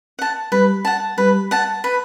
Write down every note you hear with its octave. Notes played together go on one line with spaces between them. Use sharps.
F#5 A5
G3 B4
F#5 A5
G3 B4
F#5 A5
B4